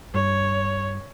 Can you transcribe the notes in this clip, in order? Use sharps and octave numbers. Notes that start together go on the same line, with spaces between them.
G2 C#5